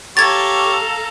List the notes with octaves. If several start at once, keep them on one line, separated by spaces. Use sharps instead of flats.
G4 A4 C#5 F5 A#5 G#6 A6